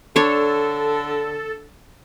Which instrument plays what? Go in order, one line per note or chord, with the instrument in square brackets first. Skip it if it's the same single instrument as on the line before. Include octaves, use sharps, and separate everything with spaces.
[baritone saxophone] D3 [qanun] D4 C#5 [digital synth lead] A4